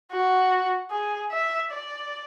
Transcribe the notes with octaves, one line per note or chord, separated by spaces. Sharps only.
F#4
G#4
E5
D5